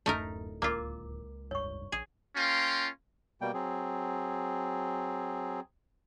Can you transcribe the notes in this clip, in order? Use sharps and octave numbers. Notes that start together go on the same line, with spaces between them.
D1 F#2 A3 D#4 A#4
C#2 A#3 F4 A#4 A#5 D6
F1 G2 C#5 C#6
A#1 G#4
A#3 C#4 F4 G5 A#5 C6
B2 G3 A#3 G5
F#3 C4 G#4